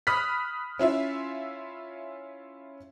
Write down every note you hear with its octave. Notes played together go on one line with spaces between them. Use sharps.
B5 D#6 F6 F#6 B6
C#4 E4 F4 E5